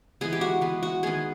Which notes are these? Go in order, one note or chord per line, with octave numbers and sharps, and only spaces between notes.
E3 G#3 B3 G#4
G4
F#4
E3 G#3 B3
F#4
D#3 G#3 B3 G#4